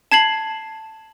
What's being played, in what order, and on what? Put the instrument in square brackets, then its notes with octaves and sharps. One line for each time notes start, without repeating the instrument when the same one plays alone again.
[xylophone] A5 G#6 C7 F#7